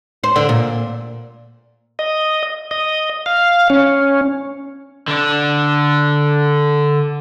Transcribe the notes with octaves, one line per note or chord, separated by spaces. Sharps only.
C5
D3
A#2
D#5
D#5
F5
C#4
D3 D4